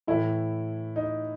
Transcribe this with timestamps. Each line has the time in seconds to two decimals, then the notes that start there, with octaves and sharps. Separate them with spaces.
0.07 A2 E3 A3 E4
0.96 D#4